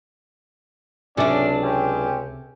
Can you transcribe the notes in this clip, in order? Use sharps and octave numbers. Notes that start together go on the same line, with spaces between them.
C#2 C3 F#3 C#4 D4 A4 D5 E5
C4 C#4 G4